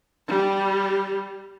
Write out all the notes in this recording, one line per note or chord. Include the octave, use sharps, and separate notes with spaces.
G3